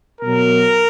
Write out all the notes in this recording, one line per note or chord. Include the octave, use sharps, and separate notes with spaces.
B2 F#3 A#4